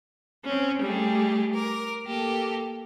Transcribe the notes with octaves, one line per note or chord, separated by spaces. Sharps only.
C4 C#4
G3 A3 G4 G#4
A#4 D6
A#3 G4 A4